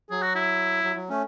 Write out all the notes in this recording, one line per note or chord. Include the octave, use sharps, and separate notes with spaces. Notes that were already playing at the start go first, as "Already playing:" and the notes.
F#3 G#4
F#4
E4
F#3
F#3
A3 C#4